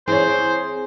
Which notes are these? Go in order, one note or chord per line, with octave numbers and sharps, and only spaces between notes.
E3 C4 G#4 C5 C#5